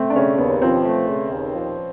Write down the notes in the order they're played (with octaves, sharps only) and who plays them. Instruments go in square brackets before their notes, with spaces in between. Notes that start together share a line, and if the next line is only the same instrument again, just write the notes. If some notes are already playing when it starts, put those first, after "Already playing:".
Already playing: [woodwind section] A3 [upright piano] C4
[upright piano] D4
[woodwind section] C#3 [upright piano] C#4
[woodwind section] D#2 [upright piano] B3
[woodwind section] F3 [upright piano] C4
[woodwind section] A3
C#3
D#2
F3